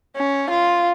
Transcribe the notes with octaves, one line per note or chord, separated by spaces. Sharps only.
C#4
F4